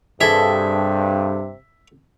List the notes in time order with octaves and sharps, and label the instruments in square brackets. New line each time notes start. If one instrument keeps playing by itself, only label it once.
[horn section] G2 [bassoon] C3 [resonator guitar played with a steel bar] G#4 A4 [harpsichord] E5